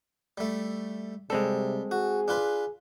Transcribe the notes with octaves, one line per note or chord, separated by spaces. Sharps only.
G3 A3
C3 G3 G#3 C4 A4
F#4 G#4
D4 F4 B4